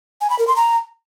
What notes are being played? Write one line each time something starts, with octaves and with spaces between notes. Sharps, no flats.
G#5
B5
A#4
C6
A#5